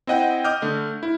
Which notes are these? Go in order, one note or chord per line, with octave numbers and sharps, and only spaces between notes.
C4 E4 D#5 F#5 G5
D#5 D6 D#6 F6 G6
D3 A3
E4